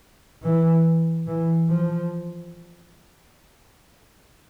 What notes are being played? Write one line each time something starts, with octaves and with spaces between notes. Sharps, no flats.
E3
E3
F3